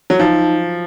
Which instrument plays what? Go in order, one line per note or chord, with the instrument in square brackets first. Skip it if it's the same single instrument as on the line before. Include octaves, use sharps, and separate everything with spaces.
[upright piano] F#3
[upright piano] F3 [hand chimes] D#4